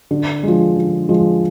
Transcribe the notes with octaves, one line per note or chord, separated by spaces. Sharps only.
D3
F3 G#3
D3
F3 G#3